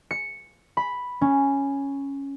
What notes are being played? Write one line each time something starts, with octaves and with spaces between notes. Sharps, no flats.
C#7
B5
C#4